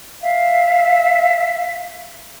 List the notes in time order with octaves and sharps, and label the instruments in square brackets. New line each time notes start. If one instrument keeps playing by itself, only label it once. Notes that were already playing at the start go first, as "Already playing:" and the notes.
[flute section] E5 F5